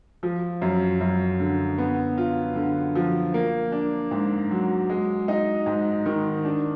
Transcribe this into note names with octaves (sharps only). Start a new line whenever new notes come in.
F3
F#2
F#2
D3
B3
F4
D3
F3
A#3
D4
G#2
F#3
G#3
D#4
G#2
D#3
D4